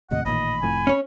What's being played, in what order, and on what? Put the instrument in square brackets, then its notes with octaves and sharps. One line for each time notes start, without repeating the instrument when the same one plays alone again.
[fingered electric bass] D#2 A2 C3 [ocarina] D#5 [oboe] F#5
[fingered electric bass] A1 A#2 D#3 [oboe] D#5 [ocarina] B5
[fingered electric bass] F1 F2 A2 [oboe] G#5
[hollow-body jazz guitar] C#4 C#5